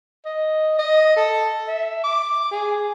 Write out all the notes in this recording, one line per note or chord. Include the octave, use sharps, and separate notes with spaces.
D#5
D#5
A4
E5
D6
G#4